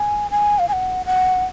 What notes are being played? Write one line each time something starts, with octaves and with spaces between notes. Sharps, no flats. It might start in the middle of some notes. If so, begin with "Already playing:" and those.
Already playing: G#5
G#5
F5
G#5
F#5
F#5